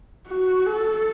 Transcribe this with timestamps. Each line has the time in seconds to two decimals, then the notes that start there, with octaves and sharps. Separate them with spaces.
0.29 F#4
0.66 A4